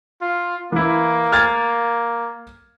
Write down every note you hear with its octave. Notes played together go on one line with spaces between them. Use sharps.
F4
E3 A#3 E4
F6 G#6 A6